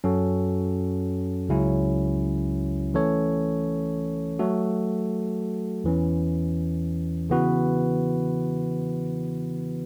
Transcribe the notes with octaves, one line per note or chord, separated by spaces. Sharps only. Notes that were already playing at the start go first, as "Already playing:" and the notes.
F#2 F#3 C#4 F#4 A4
C#2 C#3 F#3 C#4 E4
E3 A3 C#4 A4 C#5
F#3 A3 F#4 A4
E2 E3 C#4
C#3 E3 B3 F#4 B4